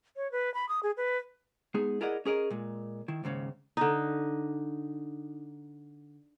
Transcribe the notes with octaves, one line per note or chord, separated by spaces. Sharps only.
C#5
B4
B5
D#6
G#4
B4
G#3 B3 D#4 G#4
E4 G#4 A#4 D5 D#5 F#5
C#4 G#4 A#4 D#5
A#2 G#3
D#3 E4
D#2 G#2 C#3 C#4
D3 D#4